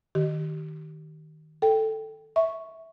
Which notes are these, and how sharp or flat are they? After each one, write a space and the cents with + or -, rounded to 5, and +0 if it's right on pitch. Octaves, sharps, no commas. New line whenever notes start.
D#3 +0 G4 -30
A4 +0 G5 +0
E5 -10 C#6 +0